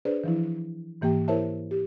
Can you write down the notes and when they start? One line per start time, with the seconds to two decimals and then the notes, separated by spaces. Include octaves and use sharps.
0.05 D4 G#4 B4 C5 D5
0.24 E3 F3 E4
1.01 G#2 E3 A#3 G4 G5
1.28 E4 A#4 C5 C#5 E5 A5
1.71 G4